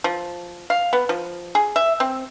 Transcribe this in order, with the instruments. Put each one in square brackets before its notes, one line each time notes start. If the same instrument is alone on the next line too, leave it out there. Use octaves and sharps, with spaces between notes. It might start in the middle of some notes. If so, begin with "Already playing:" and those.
[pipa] F3
F5
B3
F3
G#4
E5
C4